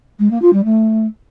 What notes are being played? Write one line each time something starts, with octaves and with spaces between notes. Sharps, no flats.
G#3
A#3
F4
G3
A3